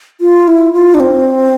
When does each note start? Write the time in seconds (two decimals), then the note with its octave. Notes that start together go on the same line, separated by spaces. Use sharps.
0.21 F4
0.47 E4
0.73 F4
0.94 D4
1.00 C4